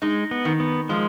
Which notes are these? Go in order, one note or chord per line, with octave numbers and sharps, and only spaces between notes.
G#3 D#4
B3
D#3
B3
F3 G#3